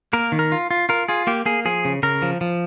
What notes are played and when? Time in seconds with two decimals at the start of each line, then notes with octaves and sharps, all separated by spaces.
0.13 A#3 A#4
0.32 D#3
0.39 A#4
0.52 F4
0.71 F4
0.89 F4 A#4
1.09 F4 G#4
1.27 A#3 G4
1.46 A#3 G#4
1.65 F3 G#4
1.85 C#3
2.03 C#3 A#4
2.22 F3
2.41 F3